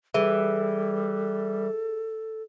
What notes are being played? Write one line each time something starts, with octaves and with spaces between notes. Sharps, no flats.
E3 G3 G#4 A4